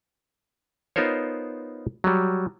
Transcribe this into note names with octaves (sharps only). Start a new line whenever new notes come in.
B3 D#4 F4 A#4 C5 C#5
F#3 G3